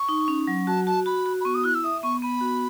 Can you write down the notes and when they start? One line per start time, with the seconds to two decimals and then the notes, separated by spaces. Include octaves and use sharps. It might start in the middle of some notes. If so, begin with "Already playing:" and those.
Already playing: C#6
0.09 D#4
0.28 C#4
0.47 F#3
0.67 F#4 A5
0.86 F#4 A5
1.06 F#4 B5
1.26 F#4
1.40 B5
1.44 B3 C#6
1.54 D#6
1.63 E4 F#6
1.74 E6
1.84 E5 D#6
2.03 B3 C#6
2.22 B3 B5
2.41 F#4